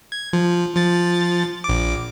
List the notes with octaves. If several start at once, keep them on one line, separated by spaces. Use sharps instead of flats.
G#6
F3
F3 A6
A#1 D6